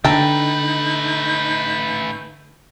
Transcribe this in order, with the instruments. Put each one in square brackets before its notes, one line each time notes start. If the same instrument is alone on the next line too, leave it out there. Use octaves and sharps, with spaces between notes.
[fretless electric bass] D3 [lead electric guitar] A3 B4 [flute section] D#4 G6 [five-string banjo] G5 A5 A#5